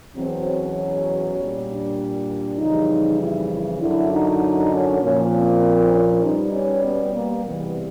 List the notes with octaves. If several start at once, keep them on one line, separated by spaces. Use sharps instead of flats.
E2 B2 F#3 C4
C#4
A#2 G3
D4
F2 C#3 E3 G3 D#4
E4
F#2 D3 F#3 E4
D#4
C#4
A#2 F3 C#4
C4
C#4
B2 G3 D#4
C#4
B3
A#3
E2 C3 E3 G3 B3